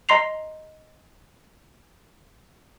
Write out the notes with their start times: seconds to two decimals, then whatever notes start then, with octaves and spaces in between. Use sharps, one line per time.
0.09 D#5 A#5 C6 C7 F7